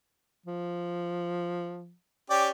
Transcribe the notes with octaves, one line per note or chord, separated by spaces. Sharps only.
F3
C#4 G4 D5 G5